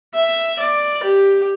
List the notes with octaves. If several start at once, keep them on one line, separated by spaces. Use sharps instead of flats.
E5
D5
G4